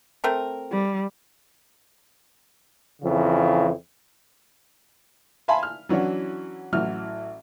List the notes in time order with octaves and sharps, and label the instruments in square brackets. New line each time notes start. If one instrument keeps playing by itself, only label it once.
[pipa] A3 C4 A#4
[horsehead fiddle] G3
[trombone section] F2 C#3 E3
[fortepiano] E5 F5 G#5 A5 B5 C6
F6
E3 F#3 C#4 D4 F#4
A1 E3 F#3 F6